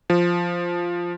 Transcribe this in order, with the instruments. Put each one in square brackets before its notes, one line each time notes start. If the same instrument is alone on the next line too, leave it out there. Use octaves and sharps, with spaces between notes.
[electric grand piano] F3